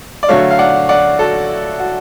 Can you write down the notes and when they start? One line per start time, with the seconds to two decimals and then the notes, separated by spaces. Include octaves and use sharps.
0.23 D5
0.28 D3 F#3 A3 C#5 F5
0.50 F5
0.59 D5 F#5
0.89 D5 F#5
1.19 F#4 A4
1.80 F#4